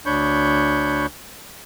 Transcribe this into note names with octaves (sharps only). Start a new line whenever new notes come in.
D2 D4 C#5 B5 C#6 G6